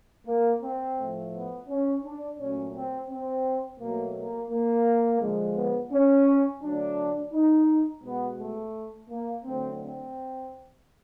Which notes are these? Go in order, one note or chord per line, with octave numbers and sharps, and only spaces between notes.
A#3
C4
A2 F3 A3
B3
C#4
D4
A#2 F#3 A3 C#4
C4
C4
B2 F#3 A3 A#3
A#3
A#3
D3 F3 G#3
B3
C#4
D3 F#3 A3 D4
D#4
B2 G#3 B3
A3
A#3
D3 F#3 A3 C4
C4